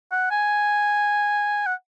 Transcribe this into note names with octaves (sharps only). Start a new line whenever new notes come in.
F#5
G#5
F#5